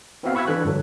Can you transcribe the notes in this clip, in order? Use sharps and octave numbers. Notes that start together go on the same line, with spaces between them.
B3 C4 E4 F#4 E5 F5
B5 C#6 E6 F#6 G#6 B6
E3 D4 A4 F#6
G2 D3 F#3